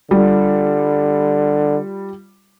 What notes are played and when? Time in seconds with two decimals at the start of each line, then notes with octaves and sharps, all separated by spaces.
0.11 D3 G3 F4